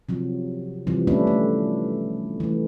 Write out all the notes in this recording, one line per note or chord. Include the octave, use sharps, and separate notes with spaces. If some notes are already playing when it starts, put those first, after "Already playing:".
C3 F3 F#3
C3 E3 F3 G3
G3 A3 B3 C#4 D4 E4
A3
E3 A3